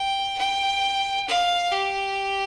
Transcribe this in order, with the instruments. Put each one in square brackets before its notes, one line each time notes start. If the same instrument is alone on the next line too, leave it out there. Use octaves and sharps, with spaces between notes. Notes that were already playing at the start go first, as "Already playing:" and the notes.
Already playing: [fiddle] G5
G5
F5
G4